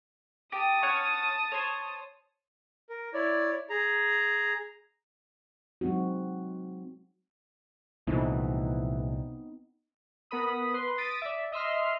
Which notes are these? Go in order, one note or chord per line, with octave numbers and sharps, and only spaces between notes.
G4 A5 D#6
C#4 C#5 F#5
C5 C#5
A#4
E4 C#5 D5
G#4 A#5
F#3 G#3 C4 D#4 F#4
C2 A#2 E3 F3 A3 B3 C4 D#4
B3 A#4 B5 D#6
B4 C6
D#6 A6 B6 D7 D#7
D5 E5
D#5 E5 C6 F6